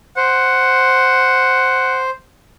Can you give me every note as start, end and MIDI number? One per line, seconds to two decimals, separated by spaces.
0.17 2.10 72
0.17 2.02 78